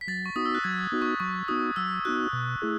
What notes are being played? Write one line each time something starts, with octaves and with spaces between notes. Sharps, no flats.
B6
F#3 A6
C#6
B3 D#4 F#4 D#6
E6
F#6
F#3 G#6
B3 D#4 F#4
C#6
F#3 C#6
B3 D#4 F#4 D#6
F#3 E6
B3 D#4 F#4 F#6
B2
A3 E4 G#4